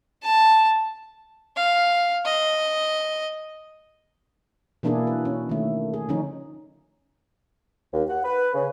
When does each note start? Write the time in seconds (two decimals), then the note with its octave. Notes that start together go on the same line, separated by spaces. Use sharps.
0.23 A5
1.56 F5
2.25 D#5
4.83 B2 E3 A#3 D4 E4 G#4
5.07 B4
5.25 C#4
5.49 D#3 A3
5.94 G#4
6.09 D3 F3 C#4 D#4
7.93 D#2
8.09 F#5
8.24 B4
8.54 C#3